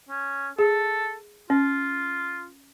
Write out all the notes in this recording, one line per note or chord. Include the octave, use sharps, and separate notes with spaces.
C#4
G#4 A4
C#4 F4